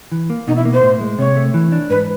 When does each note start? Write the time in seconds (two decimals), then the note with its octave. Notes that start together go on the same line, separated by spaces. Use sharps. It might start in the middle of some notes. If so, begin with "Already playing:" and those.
0.12 E3
0.30 A#3
0.47 B2 D#4
0.56 E4
0.65 A#3
0.74 C5
0.83 A2
1.01 G#3
1.19 C3 C#5
1.36 A3
1.54 E3
1.72 D4
1.90 G#2 B4